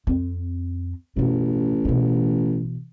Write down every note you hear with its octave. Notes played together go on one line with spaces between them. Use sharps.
F2 C4
A1 F#2 B2
B2 E3